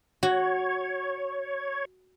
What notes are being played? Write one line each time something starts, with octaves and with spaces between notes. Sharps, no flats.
F#4 C#5